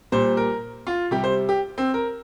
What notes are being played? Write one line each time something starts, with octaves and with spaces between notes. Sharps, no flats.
A#2 G3 C5
A#4
F4
C3 G3 G4
C5
G4
C4
A#4